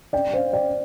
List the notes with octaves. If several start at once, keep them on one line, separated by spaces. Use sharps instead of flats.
D5 G5
C5 F5
D5 G5